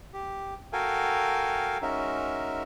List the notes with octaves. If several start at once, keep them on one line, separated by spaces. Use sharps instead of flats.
G4
F#4 A4 A#4 F5 G5 G#5
G#3 C#4 D#4 F#4 A#4 E5